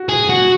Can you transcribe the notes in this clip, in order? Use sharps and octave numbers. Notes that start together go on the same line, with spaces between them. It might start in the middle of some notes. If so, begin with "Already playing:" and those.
Already playing: F#4
G#4
F#4